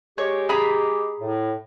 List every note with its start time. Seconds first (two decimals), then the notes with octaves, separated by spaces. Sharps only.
0.18 G#3 G4 C#5
0.49 G#4 A#5 B5
1.20 A2